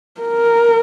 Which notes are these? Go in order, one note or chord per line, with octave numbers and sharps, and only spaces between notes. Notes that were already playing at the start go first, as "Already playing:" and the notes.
A#4